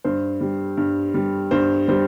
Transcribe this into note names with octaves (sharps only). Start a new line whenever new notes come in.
G2 C5
G3
G2
G3
G2 C5
G3 C5